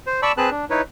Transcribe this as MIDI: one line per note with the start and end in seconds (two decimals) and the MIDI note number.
0.07 0.21 72
0.22 0.32 74
0.22 0.32 81
0.22 0.32 83
0.22 0.32 85
0.22 0.32 88
0.37 0.50 60
0.37 0.50 68
0.37 0.50 71
0.37 0.50 81
0.37 0.50 90
0.51 0.65 62
0.70 0.82 63
0.70 0.82 64
0.70 0.82 71
0.70 0.82 73